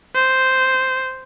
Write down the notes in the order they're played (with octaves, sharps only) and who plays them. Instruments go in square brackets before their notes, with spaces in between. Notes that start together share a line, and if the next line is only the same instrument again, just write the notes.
[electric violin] C5